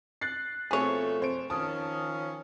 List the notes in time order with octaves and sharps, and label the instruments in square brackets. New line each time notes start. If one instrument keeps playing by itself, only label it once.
[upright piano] F#6 A6 C7
[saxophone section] B2 F3 A3 [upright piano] C4 A4 [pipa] G#4 C#5
[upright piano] F2 C5 D7
[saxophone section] D#3 F3 C#4 [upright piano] A5 D#6